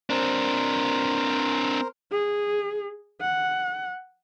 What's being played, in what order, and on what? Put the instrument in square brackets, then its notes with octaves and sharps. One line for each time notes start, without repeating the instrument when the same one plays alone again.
[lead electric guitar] C4 D4 [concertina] A#4 C5
[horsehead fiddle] G#4
F#5